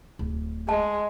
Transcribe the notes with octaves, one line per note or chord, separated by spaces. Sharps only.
D1
G#3 A5